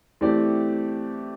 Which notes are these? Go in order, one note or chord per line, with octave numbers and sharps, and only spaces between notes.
E3 A3 C4 G4 D5